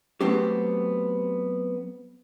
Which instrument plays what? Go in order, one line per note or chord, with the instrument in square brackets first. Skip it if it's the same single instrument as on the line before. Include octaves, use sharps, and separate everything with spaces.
[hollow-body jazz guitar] F#3 A3 B3 C4 G4